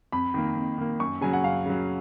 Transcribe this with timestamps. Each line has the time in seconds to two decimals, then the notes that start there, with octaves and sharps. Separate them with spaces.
0.12 F2 B5
0.34 D#3 A#3
0.56 F2
0.78 D#3 A#3
1.00 F#2 C#6
1.21 C#3 F#3 G#5
1.33 F#5
1.44 F#2 F5
1.66 C#3 F#3